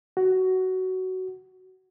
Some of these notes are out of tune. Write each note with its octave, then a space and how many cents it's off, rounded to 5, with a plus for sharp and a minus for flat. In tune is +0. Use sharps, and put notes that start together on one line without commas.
F#4 +15